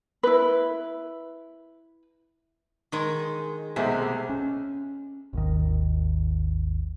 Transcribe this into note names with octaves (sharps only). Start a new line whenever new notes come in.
E4 B4
D#3 G#3
B1 C3 G#3 A3
C#4
G#1 D#2 D#3